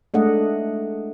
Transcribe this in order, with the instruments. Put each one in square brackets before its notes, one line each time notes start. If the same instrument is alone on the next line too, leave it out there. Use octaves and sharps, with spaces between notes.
[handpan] G#3 A3 D4 D#5 F#5